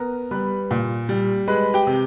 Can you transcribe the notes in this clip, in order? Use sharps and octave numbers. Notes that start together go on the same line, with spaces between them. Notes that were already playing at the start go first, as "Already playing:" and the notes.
Already playing: B3 A#4 A#5
G3 B4 B5
A#2
G3
G#3 B4 B5
G4 G5
C3